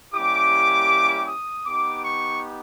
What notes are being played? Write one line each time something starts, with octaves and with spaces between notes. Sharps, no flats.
G3 A#3 C#4 E4 G4 D6
D#6
B3 D#4 G4 D6
C#6